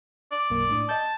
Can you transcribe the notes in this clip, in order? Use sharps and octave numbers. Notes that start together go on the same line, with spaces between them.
D5
B1 F#2 A#3
A2 D4 D#6
D#5 A5 G6